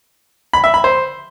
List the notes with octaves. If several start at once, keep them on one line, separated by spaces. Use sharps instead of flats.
B5
E5
B5
C5